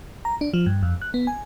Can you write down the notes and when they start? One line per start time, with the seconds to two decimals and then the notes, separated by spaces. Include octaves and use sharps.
0.25 A#5
0.41 D4
0.54 F3
0.66 G2
0.83 F2
1.02 F#6
1.14 B3
1.27 G#5